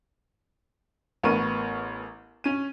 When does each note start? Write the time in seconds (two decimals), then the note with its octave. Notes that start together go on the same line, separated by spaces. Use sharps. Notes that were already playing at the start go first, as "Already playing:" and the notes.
1.23 A1 B3 A#4 C#6 D#7
2.44 C#4 D#7